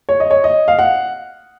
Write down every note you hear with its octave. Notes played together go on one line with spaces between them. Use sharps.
C#5
D#5
C#5
D#5
F5
F#5